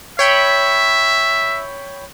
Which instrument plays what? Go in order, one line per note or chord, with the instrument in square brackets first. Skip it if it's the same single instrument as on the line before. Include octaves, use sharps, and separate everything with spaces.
[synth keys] C#5 G5 B5 [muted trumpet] E5